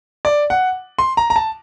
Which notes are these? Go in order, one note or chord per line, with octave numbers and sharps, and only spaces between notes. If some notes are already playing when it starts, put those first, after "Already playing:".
D5
F#5
C6
A#5
A#5
A5